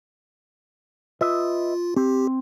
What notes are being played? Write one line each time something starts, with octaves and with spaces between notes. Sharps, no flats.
F4 B4 D#5 E5
C4 G4